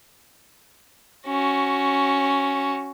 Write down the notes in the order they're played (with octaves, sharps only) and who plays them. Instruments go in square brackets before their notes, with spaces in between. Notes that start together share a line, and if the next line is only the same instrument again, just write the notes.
[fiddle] C#4 F#4